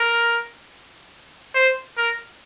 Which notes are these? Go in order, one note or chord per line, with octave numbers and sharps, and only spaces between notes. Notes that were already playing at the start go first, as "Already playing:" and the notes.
Already playing: A#4
C5
A#4